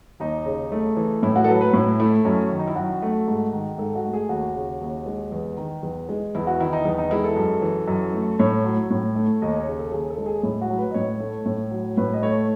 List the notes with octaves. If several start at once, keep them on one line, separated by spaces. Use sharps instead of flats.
D#2 D#4
C#3
A3
E3
A2 E4
F#4
A4
F#3 B4
B4
A2 E4
A3 E4
F#2 C#4
D#3
D#4
E4
F#2 F#4
A3
G#2
D#3
G#2 A4
F#4
A3
G#4
D#2 F#4
C#3
D#2
G#3
E2
D#3
E2
G#3
E2 E4
F#4
D#3 E4
D#4
E2
D#4
G#3 E4
A4
F#2
E3
F#2
A3
A2 C#5
F#3
A2
A3
D#2 D#5
C#5
C#3
A4
D#2 G#4
A4
G#3
G#4
A2 E4
F#4
F#3
B4
D#5
A2 C#5
A3
A2
F#3
A2 B4
D#5
A3 C#5